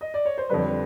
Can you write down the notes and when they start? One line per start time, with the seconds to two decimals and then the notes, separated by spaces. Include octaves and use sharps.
0.01 D#5
0.14 D5
0.25 C#5
0.38 C5
0.49 F2 D3 G3 B4